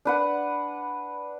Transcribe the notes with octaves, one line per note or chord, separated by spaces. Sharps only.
D4 B4 F#5